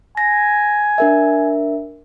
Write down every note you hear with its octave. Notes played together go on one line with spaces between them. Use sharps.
G#5 A#6
D4 A#4 E5